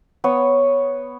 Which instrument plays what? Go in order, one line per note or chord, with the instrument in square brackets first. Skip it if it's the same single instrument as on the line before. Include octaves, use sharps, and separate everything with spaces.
[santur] B3 C#5